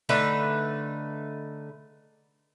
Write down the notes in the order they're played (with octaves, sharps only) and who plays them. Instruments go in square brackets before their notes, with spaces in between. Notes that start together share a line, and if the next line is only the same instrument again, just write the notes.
[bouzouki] D3 A3 D#4 B4